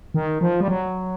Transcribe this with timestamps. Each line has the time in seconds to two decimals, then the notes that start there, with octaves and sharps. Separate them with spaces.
0.14 D#3
0.41 F3
0.61 G3
0.68 F#3